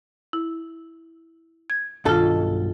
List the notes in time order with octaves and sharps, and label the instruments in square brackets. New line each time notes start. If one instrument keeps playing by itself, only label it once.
[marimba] E4
G#6
[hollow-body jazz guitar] B1 G2 A4 [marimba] D#3 F4